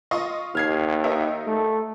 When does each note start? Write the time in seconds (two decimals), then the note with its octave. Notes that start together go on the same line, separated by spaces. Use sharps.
0.11 F4 D#5 C#6
0.55 D#2 F6 G#6 C7
1.04 D#4 A#4 E5
1.47 A3